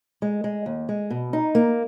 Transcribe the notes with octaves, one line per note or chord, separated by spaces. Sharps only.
G#3
G#3
D#2
G#3
B2
D#4
A#3